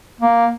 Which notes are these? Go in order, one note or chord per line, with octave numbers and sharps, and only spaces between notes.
A#3